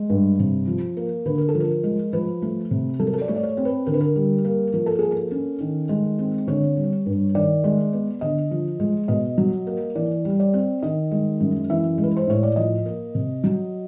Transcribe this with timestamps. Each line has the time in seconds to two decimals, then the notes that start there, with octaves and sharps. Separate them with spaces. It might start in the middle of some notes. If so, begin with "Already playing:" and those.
Already playing: G#3
0.10 G2
0.39 C3
0.67 F3
0.97 A#3
1.26 D3 B4
1.38 A#4
1.49 A4
1.55 F3
1.60 A#4
1.84 G#3
2.13 F3 B4
2.42 A3
2.71 C3
2.99 F#3 A4
3.07 A#4
3.13 A4
3.22 D5
3.28 A3 C#5
3.36 D5
3.43 C#5
3.57 C4
3.65 B4
3.86 D3 A#4
3.94 B4
4.01 A#4
4.16 G3
4.45 A#3
4.74 F3 A#4
4.86 A4
4.99 A#3 G#4
5.11 A4
5.31 C#4
5.60 D#3
5.89 G#3
6.19 C4
6.48 D3 C#5
6.76 G3
7.06 G2
7.35 D#3 D5
7.64 G#3
7.93 B3
8.21 D3 D#5
8.51 F3
8.80 G#3
9.08 B2 D#5
9.38 F#3
9.67 A#3
9.95 E3 D5
10.25 G3
10.40 D5
10.54 C4
10.83 D#3 D#5
11.11 G#3
11.40 F#2
11.70 E3 E5
11.98 G#3
12.03 B4
12.17 C5
12.27 A2 C#5
12.43 D5
12.56 F3 D#5
12.85 A#3
13.15 C3
13.44 F#3